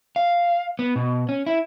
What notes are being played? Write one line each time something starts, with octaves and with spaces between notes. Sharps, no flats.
F5
B3
B2
C#4
E4